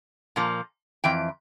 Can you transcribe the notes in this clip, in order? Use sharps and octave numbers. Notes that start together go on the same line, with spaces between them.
A#2 F3 A#3
F2 E3 G5